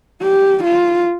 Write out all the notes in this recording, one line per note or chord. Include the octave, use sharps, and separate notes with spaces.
G4
F4